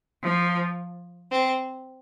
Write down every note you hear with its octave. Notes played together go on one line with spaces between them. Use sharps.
F3
C4